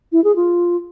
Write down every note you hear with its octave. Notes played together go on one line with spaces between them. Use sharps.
E4
G#4
F4